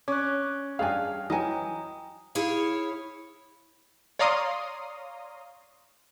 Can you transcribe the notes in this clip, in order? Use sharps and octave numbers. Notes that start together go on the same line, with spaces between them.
C#4 D6 F#6
G2 G#4 F5 G#5 F6
E3 F#3 D#5 G5 G#5 A#5 D#6
E4 G#4 C#5 F5
C#5 D5 F5 A#5 C6 D#6